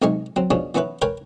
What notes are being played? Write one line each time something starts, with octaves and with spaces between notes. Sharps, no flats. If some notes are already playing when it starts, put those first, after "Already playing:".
B1 C3 G#3 D#4 G#5 C#6
F#3 C4
B2 F3 C#4 D4 G#4
E3 B3 C#4 E4 B4
A#4 B4 C#5 G5 G#5